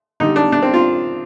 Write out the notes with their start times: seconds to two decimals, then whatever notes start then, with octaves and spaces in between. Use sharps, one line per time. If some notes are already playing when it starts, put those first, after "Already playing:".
0.20 D3 G3 D#4
0.36 D4
0.52 D4
0.62 C4
0.74 F4